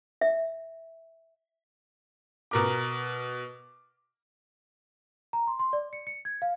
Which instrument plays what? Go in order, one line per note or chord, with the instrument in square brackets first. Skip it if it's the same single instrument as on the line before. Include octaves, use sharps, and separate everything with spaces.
[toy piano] E5
[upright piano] B2 A#4 D6
[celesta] A#5
C6
C6
D5
C#7
C#7
G#6
F5